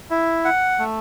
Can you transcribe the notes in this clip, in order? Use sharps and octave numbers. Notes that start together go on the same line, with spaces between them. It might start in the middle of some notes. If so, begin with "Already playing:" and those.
E4
F#5
A3